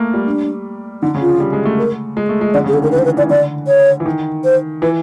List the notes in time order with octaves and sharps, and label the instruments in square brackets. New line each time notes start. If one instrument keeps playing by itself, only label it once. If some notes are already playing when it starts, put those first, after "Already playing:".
Already playing: [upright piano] A3 A#3
G3
[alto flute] D4
[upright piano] D3 [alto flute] D#4
[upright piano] C#3
[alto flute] F4
[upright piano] F3
G3
G#3
A3
[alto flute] A#4
[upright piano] G#3
A3
G#3
[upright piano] D3 [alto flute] D5
[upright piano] C#3
[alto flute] G#4
[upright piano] D3 [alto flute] A4
[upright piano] D#3 [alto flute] A#4
[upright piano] E3 [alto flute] B4
[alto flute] C5
B4
[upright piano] E3 [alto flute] D5
[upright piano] D3 [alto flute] D5
[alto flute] C#5
[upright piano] E3
D#3
[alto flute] C5
[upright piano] E3 [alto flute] B4